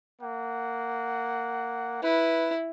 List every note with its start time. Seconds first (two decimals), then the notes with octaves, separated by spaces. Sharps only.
0.22 A#3 F#5
2.03 E4 B4